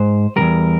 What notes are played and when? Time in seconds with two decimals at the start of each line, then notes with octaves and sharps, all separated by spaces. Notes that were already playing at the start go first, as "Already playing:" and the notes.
Already playing: G#2 C5
0.36 C3 G3 A#4
0.41 E2